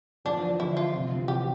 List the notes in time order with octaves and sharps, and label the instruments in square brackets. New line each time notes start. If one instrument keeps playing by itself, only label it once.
[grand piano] F3 [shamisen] D4
[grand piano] E3
F3
F3
[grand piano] D3 [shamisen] E4
[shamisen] F4
[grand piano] C3
C3
F3
E3
[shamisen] G4